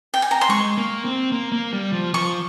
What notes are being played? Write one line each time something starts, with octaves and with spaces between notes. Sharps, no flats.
G5
G#5
A#5
C6
G#3 C#6
A#3
C4
A#3
A#3
G3
F3
F3 C#6